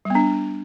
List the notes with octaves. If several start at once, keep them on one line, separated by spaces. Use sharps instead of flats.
G3 B3 D4